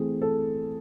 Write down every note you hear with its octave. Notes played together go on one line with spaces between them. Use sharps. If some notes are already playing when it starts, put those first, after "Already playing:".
Already playing: E3 A3 C4 G#4
A4